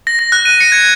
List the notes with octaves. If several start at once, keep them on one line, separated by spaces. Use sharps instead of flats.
A#6
A#6
F#6
D#7
C#7
G#6